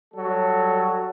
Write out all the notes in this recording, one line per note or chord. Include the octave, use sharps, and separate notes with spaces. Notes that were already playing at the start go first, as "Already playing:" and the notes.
F#3 G3 A4